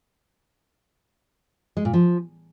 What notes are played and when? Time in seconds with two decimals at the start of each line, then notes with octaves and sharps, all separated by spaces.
1.77 G#3
1.85 A#2
1.93 F3